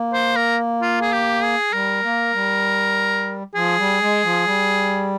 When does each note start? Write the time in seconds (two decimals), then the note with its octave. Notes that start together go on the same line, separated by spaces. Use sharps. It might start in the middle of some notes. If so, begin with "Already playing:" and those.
Already playing: A#3
0.14 C5
0.37 A#4
0.82 F4
1.02 G#4
1.13 G4
1.43 G#4
1.73 G3 A#4
2.04 A#3
2.34 G3
3.55 F3 G#4
3.79 G3
4.01 G#3
4.24 F3
4.46 G3